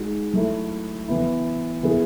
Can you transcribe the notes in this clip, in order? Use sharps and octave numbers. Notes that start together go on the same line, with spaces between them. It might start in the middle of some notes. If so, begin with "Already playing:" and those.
Already playing: G#3 D#4 F#4
F#3 A3 E4
E3 B3 E4
E3 B3 E4 G#4